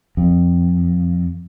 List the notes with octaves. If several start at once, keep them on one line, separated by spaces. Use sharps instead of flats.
F2